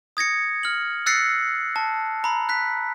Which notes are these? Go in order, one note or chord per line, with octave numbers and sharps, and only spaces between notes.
D#6 G#6 A#6 C#7
F6 F#7
E6 F#6 A6 A#6 C7 C#7
A5
A#5 B5
F#6 B6